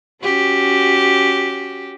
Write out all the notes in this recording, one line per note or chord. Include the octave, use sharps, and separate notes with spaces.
C#4 F#4 G4